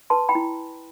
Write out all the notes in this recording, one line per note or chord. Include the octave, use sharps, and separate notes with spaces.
B4 A5 C6
G5 B5
E4